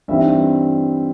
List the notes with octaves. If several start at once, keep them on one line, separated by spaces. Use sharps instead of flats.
G2 E3 G3 C4 D#4 E5